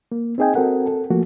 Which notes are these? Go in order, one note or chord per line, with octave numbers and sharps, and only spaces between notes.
A#3
C4 D#4 G#4 D#5 G5 G#5
C4 F#4 A4 A#4 F#5
A4
F3 A3 A#3 F#4